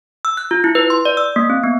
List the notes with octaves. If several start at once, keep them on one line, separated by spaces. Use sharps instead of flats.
E6
F#6
F4
E4
B4
C6
D5
E6
A#3
C4
B3